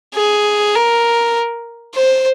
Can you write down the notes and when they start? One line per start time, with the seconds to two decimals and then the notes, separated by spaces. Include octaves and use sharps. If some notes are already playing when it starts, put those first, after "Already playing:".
0.15 G#4
0.75 A#4
1.95 C5